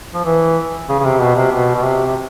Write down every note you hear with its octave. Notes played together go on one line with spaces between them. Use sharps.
F3
E3
C#3
C#3
C3
B2
C3
B2
B2
C3
C3